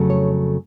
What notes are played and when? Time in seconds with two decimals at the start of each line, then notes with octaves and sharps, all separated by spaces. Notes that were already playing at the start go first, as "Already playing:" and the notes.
Already playing: F2 C#3 F#3 A3 C#4
0.10 C#5